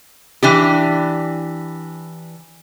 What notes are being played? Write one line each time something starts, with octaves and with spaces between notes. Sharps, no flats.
E3 D4 G4